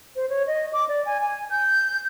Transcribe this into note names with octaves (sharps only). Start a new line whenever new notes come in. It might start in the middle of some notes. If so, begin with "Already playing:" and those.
C5
C#5
D#5
D6
D5
G#5
G#5
G6